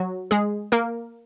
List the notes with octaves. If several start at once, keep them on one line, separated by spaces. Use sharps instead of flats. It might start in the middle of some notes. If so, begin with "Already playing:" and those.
Already playing: F#3 F#4
G#3 G#4
A#3 A#4